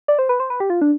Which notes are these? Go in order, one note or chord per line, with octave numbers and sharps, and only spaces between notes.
D5
C5
B4
C5
B4
G4
F4
D4